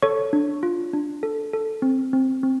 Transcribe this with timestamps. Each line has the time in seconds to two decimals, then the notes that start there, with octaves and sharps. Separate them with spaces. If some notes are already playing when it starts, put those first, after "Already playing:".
0.02 A4 C#5 C#6
0.33 D4
0.63 F4
0.93 D4
1.23 A4
1.53 A4
1.82 C4
2.13 C4
2.43 C4